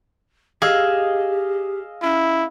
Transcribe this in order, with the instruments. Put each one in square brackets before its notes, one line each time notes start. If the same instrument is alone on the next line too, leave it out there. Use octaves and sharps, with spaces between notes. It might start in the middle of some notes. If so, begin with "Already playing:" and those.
[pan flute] G4 [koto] G#4 [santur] D#5 F5 E6
[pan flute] C#4 [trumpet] E4